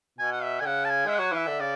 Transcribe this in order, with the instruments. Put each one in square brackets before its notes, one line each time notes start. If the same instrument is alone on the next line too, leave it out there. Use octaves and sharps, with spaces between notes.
[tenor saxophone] B2 [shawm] G#5
[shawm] F#5
E5
[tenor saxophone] D3 [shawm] G#5
[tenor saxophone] C#3 [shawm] F#5
[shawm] A5
G#5
[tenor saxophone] G#3 [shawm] E5
[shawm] F#5
[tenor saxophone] F#3
[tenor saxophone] E3 [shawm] E5
[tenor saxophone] D3
[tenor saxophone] C#3 [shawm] D5